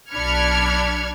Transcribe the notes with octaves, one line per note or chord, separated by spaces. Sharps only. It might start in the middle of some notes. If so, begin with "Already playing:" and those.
B1 D4 B5 F6 G#6 C#7